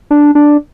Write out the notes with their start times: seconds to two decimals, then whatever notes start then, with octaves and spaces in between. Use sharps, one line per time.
0.11 D4
0.35 D4